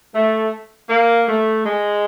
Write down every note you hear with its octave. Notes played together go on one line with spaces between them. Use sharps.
A3
A#3
A3
G#3